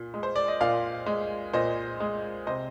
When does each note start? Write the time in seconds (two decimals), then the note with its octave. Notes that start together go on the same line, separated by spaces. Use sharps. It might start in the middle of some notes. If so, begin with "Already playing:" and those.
Already playing: A#2
0.14 G#3
0.23 C5
0.36 D5
0.48 D#5
0.60 A#2 D5 F5
1.06 G#3
1.53 A#2 C5 D#5
2.00 G#3
2.47 C3 C5 D#5